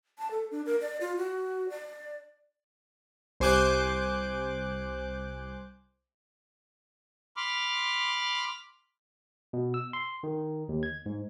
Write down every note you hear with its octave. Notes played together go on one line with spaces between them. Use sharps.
A5
A4
D4
A#4
D5
F4
F#4
D5
C2 C5 G#5 D6 F#6 G6
B5 C6 D6 F6
B2
E6
C6
D#3
D#2
G#6
G#2